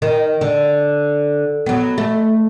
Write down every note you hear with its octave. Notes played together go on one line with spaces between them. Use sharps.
D#3
D3
F#3 B3
A3